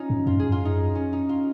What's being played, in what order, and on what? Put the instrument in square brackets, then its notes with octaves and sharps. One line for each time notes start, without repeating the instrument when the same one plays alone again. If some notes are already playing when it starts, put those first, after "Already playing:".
Already playing: [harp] C#4 D#4 F4
[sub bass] G#2
[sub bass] F#2 [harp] F4
[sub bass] G#2 [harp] G#4
[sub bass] F#2 [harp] F4
[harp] D#4
C#4
D#4
F4